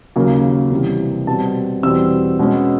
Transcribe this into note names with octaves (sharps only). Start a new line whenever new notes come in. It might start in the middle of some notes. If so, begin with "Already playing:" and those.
D#2 C#3 F#3 A#3
C3 E3 G3
B2 G3 C4 A5
E2 B2 G3 C4 E6
B2 G#3 C#4